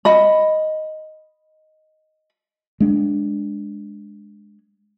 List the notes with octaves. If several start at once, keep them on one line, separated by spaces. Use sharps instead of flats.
D#5 B5
G#3 D4